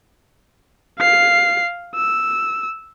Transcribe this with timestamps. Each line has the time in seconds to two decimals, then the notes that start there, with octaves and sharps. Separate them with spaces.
0.99 F5 C7
1.96 E6